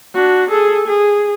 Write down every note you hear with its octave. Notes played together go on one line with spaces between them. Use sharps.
D4 F#4
G#4 A4
G#4